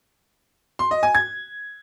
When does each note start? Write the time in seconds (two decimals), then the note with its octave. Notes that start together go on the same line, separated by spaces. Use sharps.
0.79 C6
0.91 D#5
1.03 G#5
1.15 G#6